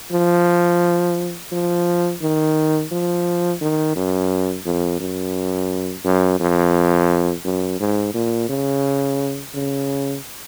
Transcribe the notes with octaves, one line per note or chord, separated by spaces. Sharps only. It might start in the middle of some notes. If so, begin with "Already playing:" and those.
F3
F3
D#3
F3
D#3
F#2
F2
F#2
F#2
F2
F#2
G#2
A#2
C#3
C#3